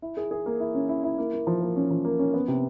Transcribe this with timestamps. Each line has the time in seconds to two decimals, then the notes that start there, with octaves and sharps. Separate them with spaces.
0.02 E4
0.17 G#4
0.31 G#4
0.46 A#3
0.60 E4
0.75 C#4
0.89 E4
1.04 E4
1.18 A#3
1.33 A#3
1.47 F3
1.61 A#3
1.76 C#4
1.91 F3
2.05 A#3
2.19 C#4
2.34 B3
2.48 C3